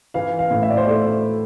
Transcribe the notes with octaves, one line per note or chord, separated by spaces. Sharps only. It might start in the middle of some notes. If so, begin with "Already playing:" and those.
E3 F5
F5
A2
E5
D5
C5
A3 D5